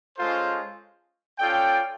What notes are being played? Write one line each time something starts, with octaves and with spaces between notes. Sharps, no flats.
G#3 C#4 F4 A4 C5
C#4 F4 A4 D5 G5